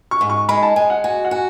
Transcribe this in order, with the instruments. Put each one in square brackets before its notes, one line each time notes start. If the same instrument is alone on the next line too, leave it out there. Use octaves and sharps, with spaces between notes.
[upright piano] C#6
[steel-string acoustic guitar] G#2
[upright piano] C#6
[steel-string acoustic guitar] G#3 [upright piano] B5
[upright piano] A5
[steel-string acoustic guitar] G#3 [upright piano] G#5
[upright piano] F#5
[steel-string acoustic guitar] F#4 [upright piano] G#5
[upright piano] F#5
[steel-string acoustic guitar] F#4 [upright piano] G#5